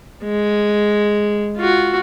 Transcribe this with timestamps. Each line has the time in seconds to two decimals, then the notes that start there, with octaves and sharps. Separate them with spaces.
0.24 G#3
1.57 F4 F#4